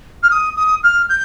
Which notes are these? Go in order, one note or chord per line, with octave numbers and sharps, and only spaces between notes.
F6
D#6
D#6
F6
G6